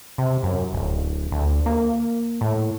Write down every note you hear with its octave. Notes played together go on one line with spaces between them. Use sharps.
C3
F#2
D1
D2
A#3
A2